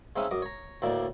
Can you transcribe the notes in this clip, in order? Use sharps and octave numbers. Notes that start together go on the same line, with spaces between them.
C#3 C4 C#4 D#4 E5
F#2 D#5 D6
C#5 A#5
D2 A2 A#3 D4 D5